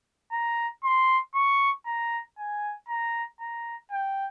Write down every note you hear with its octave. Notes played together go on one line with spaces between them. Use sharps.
A#5
C6
C#6
A#5
G#5
A#5
A#5
G5